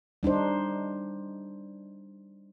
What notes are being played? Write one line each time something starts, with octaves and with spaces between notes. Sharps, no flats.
G3 D4 D#4 C5